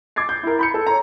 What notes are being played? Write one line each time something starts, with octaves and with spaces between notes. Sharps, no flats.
D6 G#6 A6 C7
G6
E4 A#4
B5 G6 C#7
A4
C#5 A#5